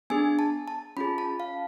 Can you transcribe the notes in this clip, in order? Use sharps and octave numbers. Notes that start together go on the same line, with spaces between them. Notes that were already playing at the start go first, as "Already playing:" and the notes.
B3 D4 G#4 G#5
A5
A5
C#4 F4 G#4 B5
A5
F5